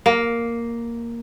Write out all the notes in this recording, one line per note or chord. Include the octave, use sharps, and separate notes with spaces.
A#3